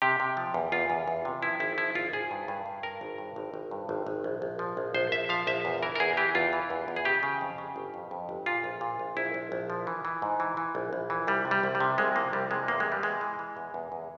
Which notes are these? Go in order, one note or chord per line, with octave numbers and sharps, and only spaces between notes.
C3 G4
C3
F3
E2
E2 F4
E2
E2
C3
F3 E4
G#1 E4
F3 E4
G#1 F4
G#1 G#4
G2
G2
G2
G2 A#4
G#1
G2
G#1
G#1
G2
G#1
G#1
A#1
A#1
F3
A#1
A#1 C5
A#1 E5
F3 F5
A#1 E5
E2
E3 A#4
A#4
E2 G#4
E3 G4
E2 F4
E3
E2
E2
G#4
C#3 G4
C#3
F2
C#3
G1
F2
F2
G1
A#2 F4
A#1
A#2
A#1
A#1 E4
A#1
A#1
F3
E3
E3
G#2
E3
E3
A#1
A#1
E3
C2 G3
C3
G3
C2
G3
C3
C2 G#3
F3 A#3
C2 G3
C3 G#3
E2 A#3
G#3
E2
G3
E2 G#3
E3
E3
E2
E2
E2